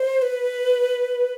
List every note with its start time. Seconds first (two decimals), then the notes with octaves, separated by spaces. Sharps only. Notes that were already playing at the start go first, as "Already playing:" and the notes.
Already playing: C5
0.22 B4